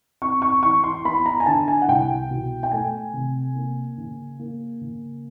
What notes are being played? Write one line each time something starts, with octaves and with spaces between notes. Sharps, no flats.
C4 C#6
C#6
E3 C#6
C6
B3 B5
A#5
G#5
D3 A5
G#5
F#5
C2 G5
B2
G5
A3 G#5
C3
A#3
C#3
A#3
C#3